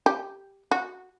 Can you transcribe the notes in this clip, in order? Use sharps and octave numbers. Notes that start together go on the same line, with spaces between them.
G4
F#4